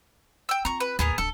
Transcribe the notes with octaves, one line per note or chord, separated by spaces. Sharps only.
G5 E6
C4 F4 A#5 C#6
B4
D#2 A2 B3 G#4 A#4
D1 D4 A4